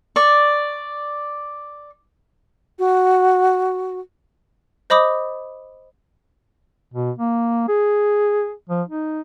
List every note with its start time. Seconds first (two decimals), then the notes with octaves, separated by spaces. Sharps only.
0.16 D5 C#6
2.79 F#4
4.90 C5 D#5 B5 D6 D#6
6.94 B2
7.18 A#3
7.68 G#4
8.69 F3
8.88 D#4